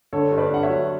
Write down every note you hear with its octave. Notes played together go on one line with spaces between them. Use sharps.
D3 A4 C#5
G2
B4 D5
G2 F#5
C#5 E5
F#3